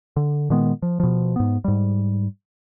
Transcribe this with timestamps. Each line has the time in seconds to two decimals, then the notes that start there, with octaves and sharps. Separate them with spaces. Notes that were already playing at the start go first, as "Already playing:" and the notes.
0.16 D3
0.50 A#2 D#3 G#3 B3
0.82 F3
1.00 B2 F3
1.36 G#2 B3
1.64 G#2 G3